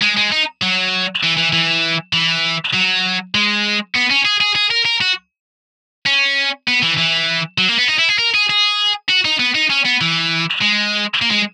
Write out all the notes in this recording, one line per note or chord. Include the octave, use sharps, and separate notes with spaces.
G#3
G#3
D#4
F#3
E3
E3
E3
E3
F#3
G#3
B3
C#4
G#4
G#4
G#4
A#4
A#4
F#4
C#4
B3
E3
E3
F#3
A#3
B3
D#4
E4
G#4
A#4
G#4
G#4
F#4
D#4
B3
D#4
C#4
B3
E3
G#3
A#3
G#3